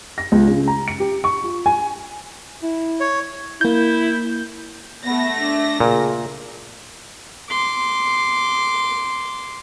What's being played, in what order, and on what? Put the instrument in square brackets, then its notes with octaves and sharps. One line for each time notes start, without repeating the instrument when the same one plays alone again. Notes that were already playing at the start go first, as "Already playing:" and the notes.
[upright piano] A#6
C#2
C#3
A#5
C#7
G4
C#6
F4
G#5
[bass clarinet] E4
[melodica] C#5
[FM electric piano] A#3 G6 [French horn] E4
[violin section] A3 A#6 [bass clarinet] B3
[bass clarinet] D4
[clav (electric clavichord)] A#2 [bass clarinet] C#3
[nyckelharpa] C6 D6